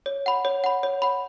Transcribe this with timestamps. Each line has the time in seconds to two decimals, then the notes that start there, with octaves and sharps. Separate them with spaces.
0.06 C#5
0.26 F#5 B5
0.45 C#5
0.64 F#5 B5
0.83 C#5
1.02 F#5 B5